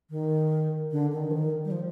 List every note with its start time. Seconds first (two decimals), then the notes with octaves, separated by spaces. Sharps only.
0.10 D#3
0.91 D3
1.13 D#3
1.31 F3
1.34 D#3
1.65 G3
1.71 F3